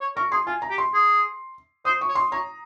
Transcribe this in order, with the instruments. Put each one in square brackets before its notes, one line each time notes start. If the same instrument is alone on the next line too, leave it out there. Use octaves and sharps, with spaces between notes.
[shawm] C#5
[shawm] A#4 [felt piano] C#6
[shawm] G#4 [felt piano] C6
[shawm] F4 [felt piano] G#5
[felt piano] A#5
[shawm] G4
[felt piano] C6
[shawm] G#4
[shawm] C5 [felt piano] D#6
[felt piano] C#6
[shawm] C#5
[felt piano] C6
[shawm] C#5 [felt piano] A#5